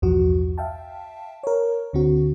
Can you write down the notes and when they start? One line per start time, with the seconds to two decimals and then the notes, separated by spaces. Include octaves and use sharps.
0.02 B1 E2 G2 F3 F#4
0.58 E5 F5 G5 A5
1.43 A#4 C#5
1.93 D2 D3 C4 F#4